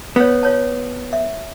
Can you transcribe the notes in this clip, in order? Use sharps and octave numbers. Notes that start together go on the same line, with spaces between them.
B3 F4 C#5
F4 C#5 A5
E5